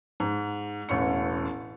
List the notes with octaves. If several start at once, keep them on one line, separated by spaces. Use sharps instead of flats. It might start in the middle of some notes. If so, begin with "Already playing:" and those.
G#2
E1 A1 C#4 C#6 C#7